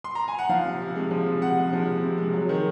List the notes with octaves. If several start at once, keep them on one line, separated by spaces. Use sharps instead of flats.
C6
A#5
G#5
F#5
F3 F5
C3
C3
G#3
F3
C3
C3 F#5
G#3
F3
C3
C3
G#3
F#3
D#3